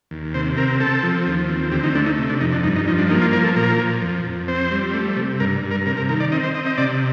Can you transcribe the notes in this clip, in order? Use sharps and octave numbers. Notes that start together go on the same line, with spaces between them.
D#2
C3 C5
C4 A#4
C4 A4
F3
D#2
C4
D2 G4
D#4
A3 D4
D#4
C3
D4
F2 D#4
D4
G2 D#4
D#4
F3 D#4
D4
A#3 D#4
F4
F3 A#4
A4
A#2 A#4
F3
F2
F2
C4 C5
G3
A3
C3
G2 A#4
G2
A#4
C3 A#4
A#4
D#3 A#4
D5
C4 D#5
C5
C4 D#5
D#5
C3 D5